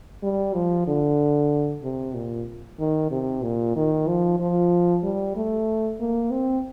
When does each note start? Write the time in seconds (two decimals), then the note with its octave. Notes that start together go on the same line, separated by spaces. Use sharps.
0.23 G3
0.54 F3
0.87 D3
1.83 C3
2.14 A#2
2.80 D#3
3.11 C3
3.43 A#2
3.76 D#3
4.08 F3
4.40 F3
5.03 G3
5.36 A3
6.00 A#3
6.31 C4